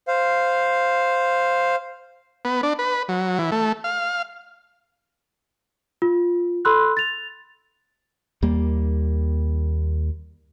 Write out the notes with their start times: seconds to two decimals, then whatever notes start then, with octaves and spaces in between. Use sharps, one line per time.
0.08 C5 F5
2.45 B3
2.63 D4
2.79 B4
3.09 F#3
3.39 E3
3.52 A3
3.84 F5
6.02 F4
6.65 A4 B5 C6 E6 F#6
6.97 A6 F7
8.42 D#2 G3 A#3